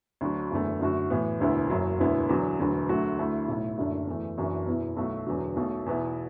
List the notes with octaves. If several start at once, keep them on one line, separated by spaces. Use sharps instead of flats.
D2 D3 F#3 D4 F#4
F#1 E2 D3 A3
F#2 D3 A3 F#4
A2 E3 B3
E1 D2 D3 B3 E4
F#1 F#2 F#3
E1 D2 D3 B3 E4
E2 D3 F#3 B3
E1 D2 D3 F#3 B3
D2 D3 F#3 A3 F#4
D2 D3 A3 E4
B1 A2 A3 E4
F#1 F#2 D3 A3 D4
E2 E3 A3
F#1 F#2 E3 D4 F#4
E2 B2 B3 E4
B1 B2 A3 F#4
E1 E2 D3 F#3
B1 B2 A3
E2 B2 B3 E4